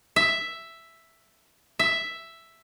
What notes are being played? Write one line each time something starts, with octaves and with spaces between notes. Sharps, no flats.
E5
E5